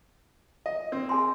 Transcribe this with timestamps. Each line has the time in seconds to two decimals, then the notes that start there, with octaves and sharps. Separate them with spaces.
0.66 D#5
0.92 C4
1.09 G#4 G#5 C6